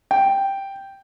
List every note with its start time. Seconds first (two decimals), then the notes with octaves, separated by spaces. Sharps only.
0.11 G5